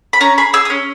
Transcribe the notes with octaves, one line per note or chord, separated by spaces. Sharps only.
B5
C#4 A#5
G#4 B5
G#4 E6
D#6
C#4